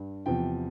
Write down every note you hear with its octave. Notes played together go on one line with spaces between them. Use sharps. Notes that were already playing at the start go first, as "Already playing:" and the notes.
Already playing: G2
E2 C3 F3 G5